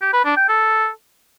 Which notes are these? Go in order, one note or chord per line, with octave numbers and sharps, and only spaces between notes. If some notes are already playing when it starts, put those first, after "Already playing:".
G4
B4
D4
G5
A4